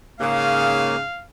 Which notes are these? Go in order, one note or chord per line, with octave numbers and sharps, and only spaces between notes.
G#2 C#3 A#3 F5